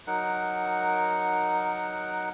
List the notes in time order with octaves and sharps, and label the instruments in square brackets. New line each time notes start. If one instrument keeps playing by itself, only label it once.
[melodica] F#3 D#4 A#4 F#5